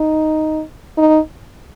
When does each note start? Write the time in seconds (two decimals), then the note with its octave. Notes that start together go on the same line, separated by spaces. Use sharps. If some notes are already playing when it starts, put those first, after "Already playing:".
Already playing: D#4
0.98 D#4